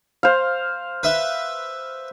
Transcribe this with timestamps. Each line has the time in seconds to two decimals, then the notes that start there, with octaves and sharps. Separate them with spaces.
0.23 C5 F5
1.03 B4 E5